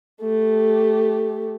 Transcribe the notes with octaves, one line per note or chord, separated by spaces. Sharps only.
A3 G4